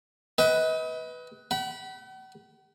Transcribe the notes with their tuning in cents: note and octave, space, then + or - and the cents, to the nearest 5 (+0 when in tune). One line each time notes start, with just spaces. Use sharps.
B4 +0 D#5 +35 G5 -15
F#5 +45 B5 -15